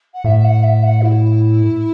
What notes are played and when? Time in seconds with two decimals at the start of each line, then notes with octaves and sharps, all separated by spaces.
0.13 F#5
0.24 A2 E5
0.44 F#5
0.63 E5
0.83 F#5
1.01 E4